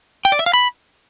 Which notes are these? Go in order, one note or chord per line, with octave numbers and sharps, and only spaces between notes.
G5
D5
E5
F5
B5